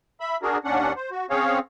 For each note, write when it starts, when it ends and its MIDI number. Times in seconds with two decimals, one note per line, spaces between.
0.20 0.37 76
0.20 0.37 83
0.42 0.58 62
0.42 0.58 66
0.42 0.58 68
0.42 0.58 70
0.65 0.93 39
0.65 0.93 61
0.65 0.93 62
0.65 0.93 78
0.96 1.10 72
1.11 1.26 66
1.30 1.59 60
1.30 1.59 61
1.30 1.59 68
1.30 1.59 73
1.30 1.59 77